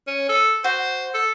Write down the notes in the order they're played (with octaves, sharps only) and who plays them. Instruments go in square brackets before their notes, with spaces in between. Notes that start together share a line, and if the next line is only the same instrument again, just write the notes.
[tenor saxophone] C#4
A4
[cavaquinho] F#4 [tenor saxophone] C5
[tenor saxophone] A4